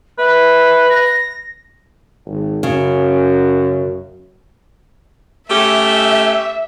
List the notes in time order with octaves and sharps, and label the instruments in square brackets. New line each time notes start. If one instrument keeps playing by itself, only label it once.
[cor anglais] B4 [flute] E5
[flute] A#6
[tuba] G#1
[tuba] F#2 [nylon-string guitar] C#3
[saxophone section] A3 C#4 G4 [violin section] E5